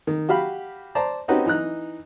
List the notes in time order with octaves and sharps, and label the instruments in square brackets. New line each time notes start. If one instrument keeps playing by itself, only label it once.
[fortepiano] D#3
F#4 G4 F5 B5
C5 D5 A5 A#5
C4 C#4 D#4 F#4 G4 B4
E3 D#4 A#5 F#6